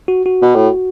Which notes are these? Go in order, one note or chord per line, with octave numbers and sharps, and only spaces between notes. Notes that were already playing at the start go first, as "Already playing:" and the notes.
F#4
F#4
B2
A2